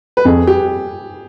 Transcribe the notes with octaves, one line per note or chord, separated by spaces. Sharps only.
B4
F2 G#4
G4